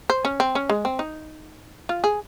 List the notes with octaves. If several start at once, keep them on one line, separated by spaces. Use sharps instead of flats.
C5
C#4
C4
C#4
G#3
C4
D#4
F4
G#4